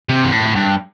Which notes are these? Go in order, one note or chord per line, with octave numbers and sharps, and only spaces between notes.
C3
G2
A2
G2